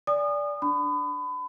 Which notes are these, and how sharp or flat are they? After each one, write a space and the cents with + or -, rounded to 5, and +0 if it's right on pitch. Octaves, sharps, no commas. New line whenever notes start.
D5 -15 G#5 -25 D#6 -35
D4 +0 B5 +30